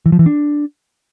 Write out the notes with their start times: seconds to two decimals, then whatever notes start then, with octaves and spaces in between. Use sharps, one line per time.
0.06 E3
0.12 F3
0.19 E3
0.26 D4